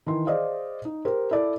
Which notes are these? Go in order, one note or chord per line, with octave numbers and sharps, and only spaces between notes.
D#3 E3 C6
G#4 C5 D5 D#5 F5
D#4
G4 A#4 C5
E4 A4 D5